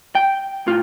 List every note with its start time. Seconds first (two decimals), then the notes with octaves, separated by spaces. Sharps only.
0.15 G5
0.67 A2 F4